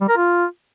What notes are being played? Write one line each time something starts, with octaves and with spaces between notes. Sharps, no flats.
G3
A#4
F4